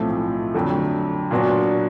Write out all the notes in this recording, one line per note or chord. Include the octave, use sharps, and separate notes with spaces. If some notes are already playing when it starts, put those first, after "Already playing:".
Already playing: B1 A2 F3 A3 C4
F2 D3 F#3 A3
A#2 F#3 B3 D4 F#4